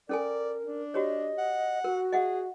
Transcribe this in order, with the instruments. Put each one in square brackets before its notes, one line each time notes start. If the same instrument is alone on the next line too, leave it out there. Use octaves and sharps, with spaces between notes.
[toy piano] C#4 A4 G#5 [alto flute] A#4 [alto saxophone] D5
[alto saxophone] D4
[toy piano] F#4 G4 C#5 [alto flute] D#5
[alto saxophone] F#5
[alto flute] F#4 [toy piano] A#4
[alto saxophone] G#4 [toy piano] D#5 E5 F#5